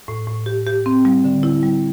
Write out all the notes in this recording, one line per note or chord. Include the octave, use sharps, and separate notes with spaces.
A2
A2
G4
G4
C4
G3
D3
E4
G3